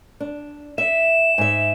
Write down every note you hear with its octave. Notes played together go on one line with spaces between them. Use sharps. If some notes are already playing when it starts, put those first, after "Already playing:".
D4
E5 E7
G#2 E5